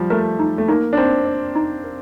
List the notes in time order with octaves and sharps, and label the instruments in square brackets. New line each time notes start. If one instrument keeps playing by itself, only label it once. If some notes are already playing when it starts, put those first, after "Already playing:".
Already playing: [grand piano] F3 G3
[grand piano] A3 [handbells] A#4
[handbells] D#4
[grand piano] A3
[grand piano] A#3 [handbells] D#4
[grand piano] D4
[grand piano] C4 [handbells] D#4
[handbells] D5
D#4
A#4